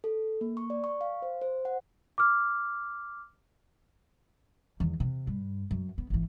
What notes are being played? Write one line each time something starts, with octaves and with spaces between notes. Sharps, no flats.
A4
A#3
C#6
D5
C#6
F5
C5
C5
F#5
D6 F6
E2 D#3
C3
G2
F#2
B3
G#1 E3